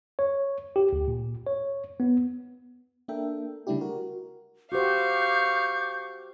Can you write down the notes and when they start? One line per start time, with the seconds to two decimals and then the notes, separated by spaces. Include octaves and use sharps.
0.19 C#5
0.76 G4
0.93 D2
1.08 A#2
1.47 C#5
2.00 B3
3.08 A#3 D4 A4 A#4 E5 G5
3.67 C#3 G3 A3 D4 E4 G4
3.81 F#4 A#4
4.72 F#4 G4 C5 F5 C#6 D6 G6